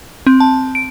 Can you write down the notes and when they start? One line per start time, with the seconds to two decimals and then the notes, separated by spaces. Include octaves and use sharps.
0.27 C4
0.40 A5
0.75 D7